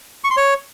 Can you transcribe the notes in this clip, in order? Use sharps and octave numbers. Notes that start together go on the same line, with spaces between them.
C#6
C6
C#5